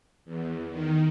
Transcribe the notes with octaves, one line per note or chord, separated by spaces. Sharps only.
E2
D#3